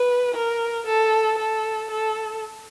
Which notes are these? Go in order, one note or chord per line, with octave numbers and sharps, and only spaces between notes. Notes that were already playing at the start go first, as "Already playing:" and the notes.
Already playing: B4
A#4
A4
A4
A4